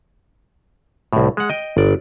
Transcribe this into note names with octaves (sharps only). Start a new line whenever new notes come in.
C2 A2
G#3 F#5
D#5 G5
G1 D5